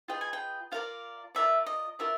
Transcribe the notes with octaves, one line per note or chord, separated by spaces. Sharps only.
F4 G#4 B4 D#5 G5
G#5
G5
F4 A#4 D5 F5
F4 A#4 D5 E5
D#5
F4 A#4 D5 E5